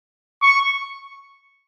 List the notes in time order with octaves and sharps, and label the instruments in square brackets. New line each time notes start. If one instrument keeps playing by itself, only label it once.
[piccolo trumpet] C#6